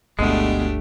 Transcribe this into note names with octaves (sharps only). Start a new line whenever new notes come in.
G1 D2 B2 G#3 A3 D4 G4